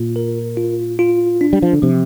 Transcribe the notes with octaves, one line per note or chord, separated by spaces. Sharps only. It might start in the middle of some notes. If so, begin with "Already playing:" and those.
Already playing: A#2 F4
A#4
F4
F4
D4
G3
F3
D3
C3 F3